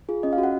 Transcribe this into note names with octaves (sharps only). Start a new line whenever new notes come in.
F4 G#4
C#4 D#5
F5
F#4
F#5